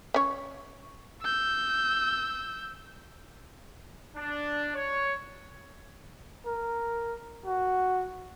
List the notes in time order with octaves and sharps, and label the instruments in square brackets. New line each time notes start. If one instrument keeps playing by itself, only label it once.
[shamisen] C#4 C#5
[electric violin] E6 G6
[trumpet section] D4
C#5
[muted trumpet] A#4
F#4